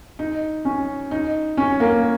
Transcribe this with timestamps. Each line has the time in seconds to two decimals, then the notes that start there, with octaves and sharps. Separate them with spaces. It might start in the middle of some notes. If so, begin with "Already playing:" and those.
0.19 D#4
0.65 C#4
1.11 D#4
1.57 C#4
1.80 A#3